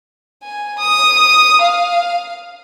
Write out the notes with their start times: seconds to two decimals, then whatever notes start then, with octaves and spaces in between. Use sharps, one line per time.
0.43 G#5
0.79 D#6
1.62 F5